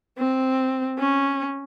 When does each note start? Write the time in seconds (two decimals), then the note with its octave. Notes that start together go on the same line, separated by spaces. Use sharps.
0.18 C4
0.98 C#4